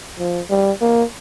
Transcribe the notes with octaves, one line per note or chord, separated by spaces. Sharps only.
F3
G3
A#3